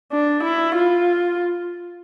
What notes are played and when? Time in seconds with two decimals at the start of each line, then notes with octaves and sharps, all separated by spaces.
0.13 D4
0.43 E4
0.75 F4